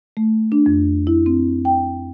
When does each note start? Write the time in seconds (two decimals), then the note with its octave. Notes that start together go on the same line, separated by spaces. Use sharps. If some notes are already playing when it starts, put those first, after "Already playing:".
0.17 A3
0.52 D4
0.66 F2
1.07 E4
1.26 C4
1.65 G5